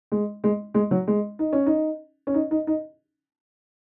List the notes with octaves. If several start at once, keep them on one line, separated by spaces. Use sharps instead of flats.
G#3
G#3
G#3
F#3
G#3
D#4
C#4
D#4
C#4
D#4
D#4
D#4